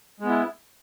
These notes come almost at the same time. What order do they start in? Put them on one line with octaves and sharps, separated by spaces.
G#3 B3 E4